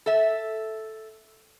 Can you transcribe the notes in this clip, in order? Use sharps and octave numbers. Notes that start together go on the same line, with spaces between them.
A4 E5